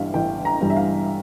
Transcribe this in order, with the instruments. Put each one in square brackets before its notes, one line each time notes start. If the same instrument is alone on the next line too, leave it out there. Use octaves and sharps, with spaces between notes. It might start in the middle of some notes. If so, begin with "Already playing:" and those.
Already playing: [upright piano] A1 G2 E3 G3 E5 F5
A1 G5
A#5
G2 E3 G3
E5
F5